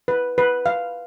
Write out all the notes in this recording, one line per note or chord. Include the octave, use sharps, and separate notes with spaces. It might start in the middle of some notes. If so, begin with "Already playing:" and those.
B4
B4
F5